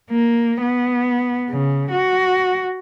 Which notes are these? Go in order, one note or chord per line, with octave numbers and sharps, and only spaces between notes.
A#3
B3
C#3
F#4